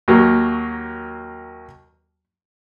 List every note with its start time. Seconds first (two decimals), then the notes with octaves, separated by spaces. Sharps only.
0.08 D#2 F#3 A#3